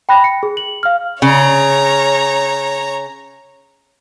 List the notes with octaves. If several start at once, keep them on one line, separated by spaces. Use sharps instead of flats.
G5 B5 F#6 A#6
C#7
G#4
F#7
F5 F6
C#3 C#5 A#5